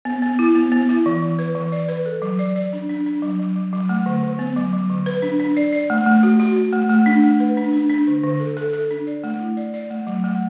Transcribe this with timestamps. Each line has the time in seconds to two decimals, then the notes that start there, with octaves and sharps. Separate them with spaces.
0.05 B3
0.22 B3
0.39 E4
0.55 B3
0.72 B3
0.89 E4
1.06 E3
1.22 E3
1.39 B4
1.55 E3
1.72 D5
1.89 B4
2.06 A4
2.22 F#3
2.39 D5
2.56 D5
2.73 D4
2.89 D4
3.07 D4
3.22 F#3
3.39 F#3
3.56 F#3
3.73 F#3
3.89 A3
4.06 D3
4.23 D3
4.39 B3
4.56 F#3
4.73 F#3
4.90 D3
5.06 B4
5.22 D4
5.40 D4
5.57 D5
5.73 D5
5.90 A3
6.06 A3
6.23 F#4
6.40 F#4
6.56 F#4
6.73 A3
6.90 A3
7.06 D4
7.23 A3
7.40 B4
7.57 D4
7.73 D4
7.89 D4
8.07 D3
8.23 D3
8.40 A4
8.57 A4
8.73 A4
8.91 D4
9.07 D5
9.24 A3
9.40 E4
9.57 D5
9.74 D5
9.90 A3
10.07 F#3
10.24 A3